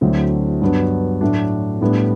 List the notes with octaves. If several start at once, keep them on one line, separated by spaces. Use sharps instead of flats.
D2 D3 F#3 C4 E4
G2 F#3 B3 D4
A2 F#3 A3 D4
A2 G3 B3 D4